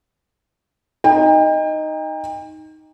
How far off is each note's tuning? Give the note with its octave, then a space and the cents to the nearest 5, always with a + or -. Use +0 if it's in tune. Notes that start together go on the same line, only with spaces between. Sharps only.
D#4 +0 G5 +35